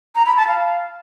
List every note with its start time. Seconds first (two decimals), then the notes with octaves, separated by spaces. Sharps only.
0.15 A#5
0.26 B5
0.37 A5
0.47 F5